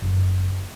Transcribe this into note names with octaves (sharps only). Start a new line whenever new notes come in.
F#1